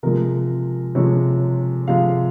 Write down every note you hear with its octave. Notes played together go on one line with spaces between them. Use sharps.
C3 F3 G#3 A#4
C3 F3 G#3 C#5
C3 F3 G#3 F5